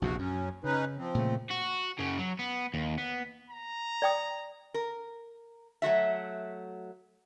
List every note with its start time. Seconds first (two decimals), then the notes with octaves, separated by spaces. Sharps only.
0.02 A#1 E2 C3 F#4
0.19 F#2 F#3 C#4
0.64 C#3 C#4 D#4 B4
0.98 F3 C4
1.15 A#2 C#3 A3
1.50 F#4
1.99 F#2 C#3
2.19 F#3
2.40 B3
2.74 D#2
2.98 B3
3.50 A#5
4.02 D5 G5 D#6
4.74 A#4
5.82 F#3 A3 F#4 E5